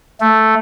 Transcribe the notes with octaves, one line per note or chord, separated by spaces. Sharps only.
A3